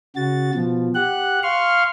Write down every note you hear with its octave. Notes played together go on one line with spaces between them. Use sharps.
C#3 F#4 A6
B2 F3
G4 F#5 F#6
F5 C6 C#6 F6